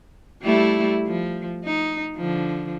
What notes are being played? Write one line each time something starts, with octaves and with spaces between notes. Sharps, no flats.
G3 A3 E4
F3
D#4
D3 F3